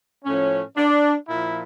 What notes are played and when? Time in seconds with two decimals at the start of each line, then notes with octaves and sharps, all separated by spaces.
0.24 A2 F3 C#4
0.77 D4
1.27 A#2 F3 E4